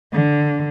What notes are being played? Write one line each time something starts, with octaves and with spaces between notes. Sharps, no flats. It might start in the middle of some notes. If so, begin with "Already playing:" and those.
D3